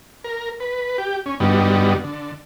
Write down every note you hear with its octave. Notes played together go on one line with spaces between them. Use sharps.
A#4
B4
G4
C#4
G2 D3 F#3 G3 B3 D#4
D3